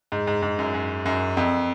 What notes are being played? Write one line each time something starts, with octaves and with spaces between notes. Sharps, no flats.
G#2
G#2
G#2
F#2
F#2
F#2
F2